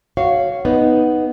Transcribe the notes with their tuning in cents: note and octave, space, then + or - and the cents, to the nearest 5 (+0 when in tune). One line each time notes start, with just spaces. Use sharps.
F#4 +0 C#5 +0 F5 -15
B3 +0 D#4 +0